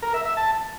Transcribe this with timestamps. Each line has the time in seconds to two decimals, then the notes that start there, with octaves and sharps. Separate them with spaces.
0.02 A#4
0.14 E5
0.25 E5
0.37 A5